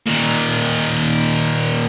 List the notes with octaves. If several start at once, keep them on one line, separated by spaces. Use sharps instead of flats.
A#2 D#3